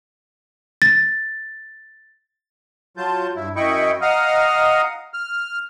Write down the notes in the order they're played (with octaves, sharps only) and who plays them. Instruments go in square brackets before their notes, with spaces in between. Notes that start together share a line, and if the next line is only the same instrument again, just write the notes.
[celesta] A6
[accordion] F#3 F4 A5 G6
G2 E4
F#2 E4 D#5 G5 B5 C#6
D#5 F5 F#5 A#5 D#6 F6
F6